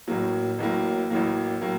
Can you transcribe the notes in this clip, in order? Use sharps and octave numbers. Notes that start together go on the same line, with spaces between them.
A1 A2 F#3 A#3
A1 A2 F#3 A#3
A1 A2 F#3 A#3
A2 F#3 A#3